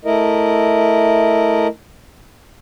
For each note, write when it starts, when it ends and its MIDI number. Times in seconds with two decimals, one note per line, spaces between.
0.05 1.67 57
0.05 1.67 64
0.05 1.67 70
0.05 1.67 75